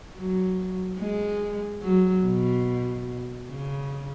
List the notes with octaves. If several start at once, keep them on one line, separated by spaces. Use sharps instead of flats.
F#3
G#3
F#3
B2
C#3